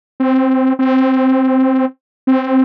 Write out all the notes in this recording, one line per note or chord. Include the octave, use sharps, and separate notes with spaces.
C4
C4
C4